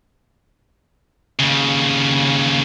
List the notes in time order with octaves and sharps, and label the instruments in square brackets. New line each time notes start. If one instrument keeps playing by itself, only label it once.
[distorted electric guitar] D#2 C#3